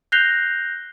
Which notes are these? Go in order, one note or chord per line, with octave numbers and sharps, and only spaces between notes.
F#6 G6 A#6 C7 F7 G7